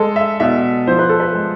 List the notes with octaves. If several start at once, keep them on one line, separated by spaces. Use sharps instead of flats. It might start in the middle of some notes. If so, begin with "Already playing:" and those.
Already playing: G#3 A4
E5
B2 E5
F3 C5
B4
A4
B4
G#3